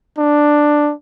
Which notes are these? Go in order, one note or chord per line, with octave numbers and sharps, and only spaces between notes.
D4